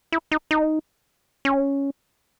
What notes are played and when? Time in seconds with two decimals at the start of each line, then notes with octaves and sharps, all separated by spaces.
0.12 E4
0.32 D#4
0.51 D#4
1.45 C#4